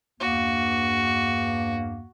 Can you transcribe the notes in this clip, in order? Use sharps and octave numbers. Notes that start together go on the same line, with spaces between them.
E2 G2 A#3 F#4